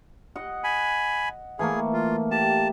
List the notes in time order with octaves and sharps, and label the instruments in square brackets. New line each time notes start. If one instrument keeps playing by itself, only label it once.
[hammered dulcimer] D#5 F#5
[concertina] G#5 B5
[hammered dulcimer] E3 A3 A#3 [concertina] G#4
[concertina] F4
[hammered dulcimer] G4 [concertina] A5